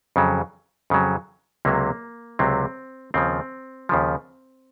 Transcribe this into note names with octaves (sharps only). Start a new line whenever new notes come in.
F2 C#3 F#3
F2 C#3 F#3
C#2 C3 F#3 A#3
C#2 C3 F#3 C4
D#2 C#3 F3 C4
D#2 C#3 F3